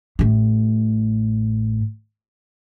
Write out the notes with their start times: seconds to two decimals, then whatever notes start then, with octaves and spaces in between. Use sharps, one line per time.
0.19 A1 A2